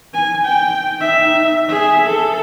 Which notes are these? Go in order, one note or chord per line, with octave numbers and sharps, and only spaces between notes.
G#5
G5
D#4 E5
G#4 E5
A4